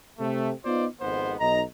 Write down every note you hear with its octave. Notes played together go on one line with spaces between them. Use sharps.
C3 A3
B3 D#4 F4 C5 D5
G#1 F2 G#2 B3 C5
B1 D#4 D#5 A#5